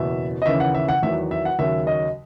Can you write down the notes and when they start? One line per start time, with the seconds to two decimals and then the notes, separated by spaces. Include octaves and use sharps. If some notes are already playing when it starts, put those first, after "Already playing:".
Already playing: F#1 E2 B2 E5
0.42 D#5
0.46 D#2 C#3 E3 E5
0.60 F#5
0.75 E5
0.88 F#5
1.03 E2 D#3 F#3 E5
1.31 E5
1.45 F#5
1.59 D#2 C#3 F#3 E5
1.87 D#5